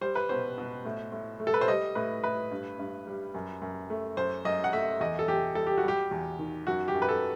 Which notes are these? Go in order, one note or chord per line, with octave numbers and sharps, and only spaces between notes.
G3 C5
B4
B2 C5
B2
A2
A2
A3
A4
B4
C5
G3 D#5
A2 B4
A2 B4
G2
G2
G3
F#2
F#2
A3
F#2 C5
F#2 D#5
F#5
A3 E5
E2 D#5
A4
E2 G4
G3 A4
G4
F#4
G3 G4
E2
D#3
F#2 F#4
G4
F#2
B4
A4